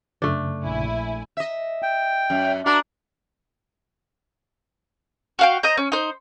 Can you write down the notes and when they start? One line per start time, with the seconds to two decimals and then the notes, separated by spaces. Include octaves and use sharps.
0.22 F#2 C#3 A3 D4
0.63 A#1 E4 G#5
1.37 D#5 E5
1.83 G5
2.30 F#2
2.66 D4 F#4 A#4
5.39 F#4 F5 G5
5.63 C5 D#5 A#5 G6
5.77 C#4
5.92 D#4 C5